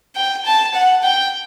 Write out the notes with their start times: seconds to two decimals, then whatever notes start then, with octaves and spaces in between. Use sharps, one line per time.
0.16 G5
0.46 A5
0.74 F#5
1.03 G5